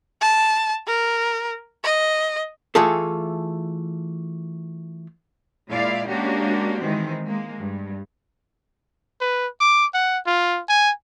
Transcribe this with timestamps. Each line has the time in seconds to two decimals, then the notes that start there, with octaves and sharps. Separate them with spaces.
0.21 A5
0.87 A#4
1.84 D#5
2.75 E3 A3 F4 G#4 A4
5.70 A#2 G#3 E4 D5 F5
6.09 G#3 A#3 C#4 D4 F#4 G4
6.81 D#3 E3 G#3 C4
7.26 G#3 A#3
7.59 G2
9.20 B4
9.60 D6
9.94 F#5
10.26 F4
10.69 G#5